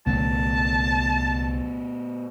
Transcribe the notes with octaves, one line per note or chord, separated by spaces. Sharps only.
C2 A#2 D3 F#3 A3 B3 A5